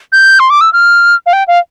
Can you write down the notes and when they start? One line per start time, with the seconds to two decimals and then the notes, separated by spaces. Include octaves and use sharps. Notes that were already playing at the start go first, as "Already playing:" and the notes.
0.12 G6
0.40 C6
0.50 D6
0.61 E6
0.73 F6
1.26 F5
1.33 G5
1.48 F5